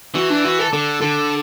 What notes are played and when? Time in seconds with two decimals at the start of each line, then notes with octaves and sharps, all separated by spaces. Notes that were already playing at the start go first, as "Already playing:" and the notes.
0.14 E3 F#4
0.30 D4
0.44 F#4
0.59 A4
0.73 D3 A4
1.01 D3 A4